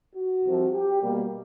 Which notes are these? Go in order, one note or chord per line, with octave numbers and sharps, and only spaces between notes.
F#4
C2 C3 F3
G4
B2 G3 A#3